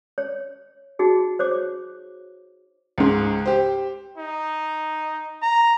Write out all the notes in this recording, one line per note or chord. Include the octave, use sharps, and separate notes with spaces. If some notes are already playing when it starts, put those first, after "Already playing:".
C#5
D#4 F#4 G#4
C5 C#5 D6
C#2 G#2
G4 C5
D#4
A#5